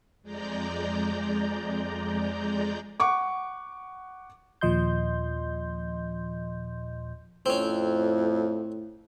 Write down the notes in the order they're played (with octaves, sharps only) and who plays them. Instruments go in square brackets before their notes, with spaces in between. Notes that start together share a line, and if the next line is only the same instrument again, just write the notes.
[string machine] F2 G#3 D5 A#5 G6
[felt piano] F#5 C#6 D6
[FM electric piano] D#2 A#2 F3 D#5 C6 G6
[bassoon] F2 [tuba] A2 [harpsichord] C4 C#4